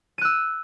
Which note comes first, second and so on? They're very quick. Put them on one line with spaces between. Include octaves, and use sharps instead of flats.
D#7 F#6 E6